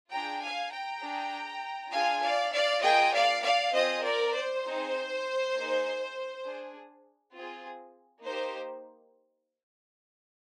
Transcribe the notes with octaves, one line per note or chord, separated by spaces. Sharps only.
D4 F4 G#4 G5 A#5
F5 G#5
G5 A#5
D4 G#4
D4 F4 G#4 F5 G#5
D5 F5
D5 F5
A#3 F4 G#4 D#5 G5
D5 F5
D5 F5
C4 F4 G#4 C5 D#5
A#4 D5
C5
C4 D#4 G#4
A#3 D#4 G#4
D4 G#4
C4 F4 G#4
A#3 D#4 G4 C5